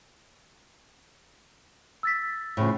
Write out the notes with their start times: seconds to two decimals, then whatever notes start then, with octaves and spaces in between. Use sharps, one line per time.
2.03 E6 A6 B6
2.57 A2 C#3 F3